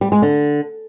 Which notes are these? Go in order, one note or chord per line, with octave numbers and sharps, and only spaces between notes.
G3
G#3
D3